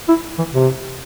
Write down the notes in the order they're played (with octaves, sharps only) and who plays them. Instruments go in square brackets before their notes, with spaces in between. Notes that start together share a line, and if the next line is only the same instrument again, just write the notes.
[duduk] E4
E3
C3